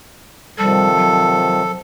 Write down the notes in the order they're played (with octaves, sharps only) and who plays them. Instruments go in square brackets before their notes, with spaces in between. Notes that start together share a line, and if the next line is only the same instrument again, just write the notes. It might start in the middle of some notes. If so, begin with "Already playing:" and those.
[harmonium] C3 D#3 F3 [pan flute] G3 [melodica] A4
[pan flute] F#3